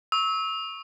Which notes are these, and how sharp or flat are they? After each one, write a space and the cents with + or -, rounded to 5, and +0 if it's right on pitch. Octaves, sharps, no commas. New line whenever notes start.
C#6 +0 E6 -30